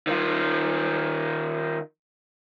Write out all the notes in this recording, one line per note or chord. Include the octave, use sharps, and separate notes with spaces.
D#3 F4